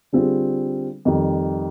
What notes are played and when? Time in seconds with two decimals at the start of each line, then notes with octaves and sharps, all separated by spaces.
0.13 D3 G3 C4 F4 G#4
1.05 F2 D#3 G3